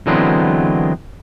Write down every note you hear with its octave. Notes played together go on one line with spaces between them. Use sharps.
D3 E3 F#3 G#3 B3 C4